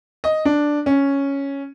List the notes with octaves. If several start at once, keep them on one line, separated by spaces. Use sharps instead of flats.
D#5
D4
C#4